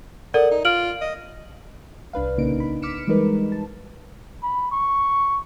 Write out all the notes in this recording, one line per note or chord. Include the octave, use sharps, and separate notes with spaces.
A4 A#4 D5 F#5
D#4
F4 F6 D7 F#7
D#5
C2 D4 B4 F5
A#1 C#3 A#3 D#4 D7
B5
D6 F6 B6 C#7 D7 E7
E3 G3 G#3 D#4 A#4 B4
A5
B5
C#6